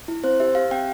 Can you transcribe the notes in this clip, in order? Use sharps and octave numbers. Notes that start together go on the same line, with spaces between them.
E4
C4 C5
G4 E5
G4 F5
C4 G5